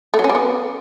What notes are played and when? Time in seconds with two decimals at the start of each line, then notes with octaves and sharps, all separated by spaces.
0.14 A3
0.19 F#3
0.24 C#4
0.29 G3
0.35 B3